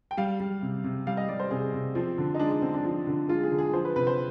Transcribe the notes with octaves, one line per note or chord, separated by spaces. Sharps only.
G5
G3 F5
G3
C3
C3
G3 F5
D#5
G3 D5
C5
C3 G#4
C3
F3 C4
D3
D#4
G#3 D4
D4
D3 C4
D4
F3
D3
G#3 F4
G#4
D3
G#4
F3 C5
B4
C3 B4
C5